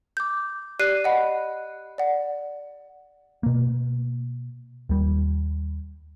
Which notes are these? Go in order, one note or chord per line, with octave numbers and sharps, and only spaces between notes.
D6 G6
G4 D5 F#6 C7 D#7
D#5 F#5 B5
D5 F#5
B2 A#3
D#2 G3